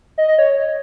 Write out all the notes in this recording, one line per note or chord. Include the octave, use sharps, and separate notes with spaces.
D#5
D#5
C#5